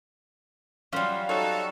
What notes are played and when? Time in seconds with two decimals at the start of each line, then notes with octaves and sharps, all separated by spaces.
0.93 F#3 G3 C#4 F4 C5 F5
1.29 D#4 F#4 A4 C#5